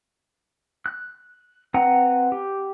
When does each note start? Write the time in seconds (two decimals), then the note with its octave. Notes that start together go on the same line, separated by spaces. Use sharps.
0.86 F#6
1.74 C4 B4 F#5 A#5
2.32 G4